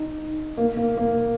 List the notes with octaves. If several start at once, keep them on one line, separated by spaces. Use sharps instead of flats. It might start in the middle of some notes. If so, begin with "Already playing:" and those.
Already playing: D#4
A#3
A#3
A#3